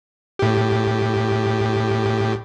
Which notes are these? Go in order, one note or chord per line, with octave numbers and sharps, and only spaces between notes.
A2 G4